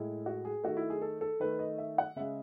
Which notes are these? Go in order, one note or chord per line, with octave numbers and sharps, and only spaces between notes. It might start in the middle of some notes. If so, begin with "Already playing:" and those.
Already playing: A2 G#3 E4
F#4
G#4
D#3 A3 F#4
E4
G#4
A4
A4
D#3 A3 B4
D#5
E5
F#5
C#3 G#3 E5